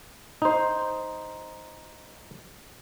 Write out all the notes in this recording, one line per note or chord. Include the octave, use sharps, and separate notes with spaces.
D#4 C5